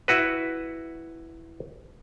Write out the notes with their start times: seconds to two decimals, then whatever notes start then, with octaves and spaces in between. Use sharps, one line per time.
0.08 E4 F#4 B4